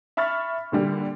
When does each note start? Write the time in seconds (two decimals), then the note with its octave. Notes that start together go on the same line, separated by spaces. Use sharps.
0.17 E5 B5 C#6 F6 A6
0.72 A#2 D3 G3